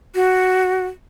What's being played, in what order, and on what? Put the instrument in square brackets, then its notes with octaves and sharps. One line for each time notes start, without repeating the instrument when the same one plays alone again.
[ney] F#4